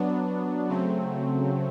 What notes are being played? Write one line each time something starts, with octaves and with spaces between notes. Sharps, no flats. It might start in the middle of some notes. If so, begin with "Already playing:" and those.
Already playing: F#3 B3 D4
C#3 F#3 A3 C4